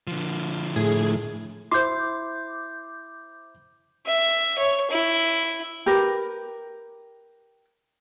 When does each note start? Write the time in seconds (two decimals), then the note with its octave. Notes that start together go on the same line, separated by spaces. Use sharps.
0.07 D3 F3
0.76 A2 G#4
1.71 E4 C5 C6 D6 G6
4.07 E5
4.59 C#5
4.91 E4
5.86 G4 A#4 B4